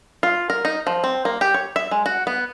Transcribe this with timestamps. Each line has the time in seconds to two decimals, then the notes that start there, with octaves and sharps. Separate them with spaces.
0.23 F4
0.50 A#4
0.65 D#4
0.87 F3
1.04 C4
1.25 A#3
1.41 G4
1.54 C#5
1.76 E5
1.91 G#3
2.06 F#4
2.27 B3